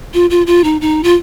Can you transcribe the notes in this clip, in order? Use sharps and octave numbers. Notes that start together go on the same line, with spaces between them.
F4
F4
F4
D#4
D#4
F4